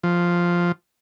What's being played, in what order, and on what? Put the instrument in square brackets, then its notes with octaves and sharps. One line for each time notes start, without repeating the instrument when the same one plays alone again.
[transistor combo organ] F3